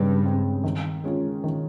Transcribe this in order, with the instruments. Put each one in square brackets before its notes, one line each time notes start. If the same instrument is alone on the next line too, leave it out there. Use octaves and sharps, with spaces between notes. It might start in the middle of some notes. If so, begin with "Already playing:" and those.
Already playing: [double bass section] G2 [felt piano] C#3 G#3 C4
[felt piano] G#3 C4
D#3
G#3 C#4 F4
D#3